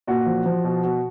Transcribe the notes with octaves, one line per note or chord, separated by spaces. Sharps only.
A#2 F#4
F3
F3
B2
B2